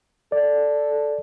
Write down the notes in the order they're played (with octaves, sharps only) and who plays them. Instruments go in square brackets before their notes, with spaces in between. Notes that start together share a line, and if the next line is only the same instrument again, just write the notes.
[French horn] A4 [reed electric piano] D5